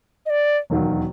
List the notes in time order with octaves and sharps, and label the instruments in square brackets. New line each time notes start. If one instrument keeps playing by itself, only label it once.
[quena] D#5
D5
[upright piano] E1 D#2 D#3 F#3